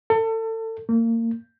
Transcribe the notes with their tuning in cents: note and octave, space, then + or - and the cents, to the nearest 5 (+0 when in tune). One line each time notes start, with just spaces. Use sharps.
A4 +30
A#3 -30